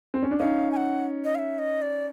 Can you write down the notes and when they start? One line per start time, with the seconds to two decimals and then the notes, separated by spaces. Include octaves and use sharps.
0.14 C4
0.23 C#4
0.31 D4
0.39 C#4 D#4 F5
0.71 G#5
0.76 F#5
1.24 D#5
1.35 F5
1.39 E5
1.59 D#5
1.82 D5